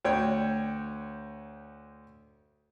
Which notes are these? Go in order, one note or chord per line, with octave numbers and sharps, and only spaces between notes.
D2 C#5 G5